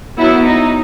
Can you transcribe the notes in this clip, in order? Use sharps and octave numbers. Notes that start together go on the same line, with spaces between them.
F#3 B3 E4
D#4